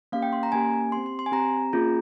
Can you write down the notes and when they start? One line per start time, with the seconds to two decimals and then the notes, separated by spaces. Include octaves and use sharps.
0.12 A#3 C#4 G4 F5
0.22 G5
0.33 C6
0.43 A#5
0.52 A#3 C#4 G4 G#5
0.92 C4 G4 C6
1.06 C6
1.19 C6
1.26 G#5
1.32 C4 G4 A#5
1.73 A#3 C#4 F4 G#4